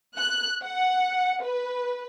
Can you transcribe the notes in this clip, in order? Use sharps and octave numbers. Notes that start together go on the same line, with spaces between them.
F#6
F#5
B4